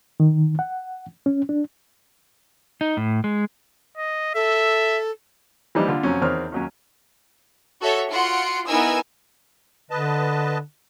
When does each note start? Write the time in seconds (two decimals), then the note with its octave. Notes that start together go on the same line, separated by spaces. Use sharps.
0.20 D#3
0.59 F#5
1.26 C#4
1.49 D4
2.81 D#4
2.97 A2
3.24 G#3
3.98 D#5
4.35 A4 E5
5.75 E3 F3 G3 D4 D#4
5.88 D3 F4
6.03 F2 F#3 C#4
6.22 E2 D#3 C4 C#5 F6
6.52 D#2 F#3 C#4
7.80 F#4 A4 C#5 E5
8.10 F4 F#4 F#5 C6 C#7 D7
8.65 B3 D#4 E4 A#4 G#5 E6
9.91 D3 B4 D#5 A5